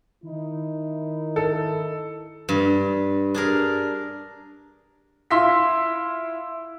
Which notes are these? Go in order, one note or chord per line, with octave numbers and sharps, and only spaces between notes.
D#3 D#4 E4
A4
G2
D4 G#4 A#4
E4 F4 C6 E6 B6